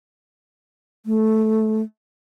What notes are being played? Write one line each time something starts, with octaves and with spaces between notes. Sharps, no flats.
A3